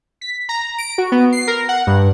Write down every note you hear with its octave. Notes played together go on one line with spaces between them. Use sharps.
B6
A#5
D7
F#4
B3
C7
A#4
F#5
G2